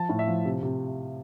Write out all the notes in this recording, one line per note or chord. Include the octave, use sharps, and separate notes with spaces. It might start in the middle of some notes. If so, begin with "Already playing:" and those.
Already playing: F3 A5
A2
E5
F3
C3
C3